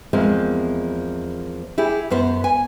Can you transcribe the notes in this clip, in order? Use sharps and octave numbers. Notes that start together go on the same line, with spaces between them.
E2 F3 G#3 A#3 C4
E4 G4 G#4
F#2 B3 C5
G#5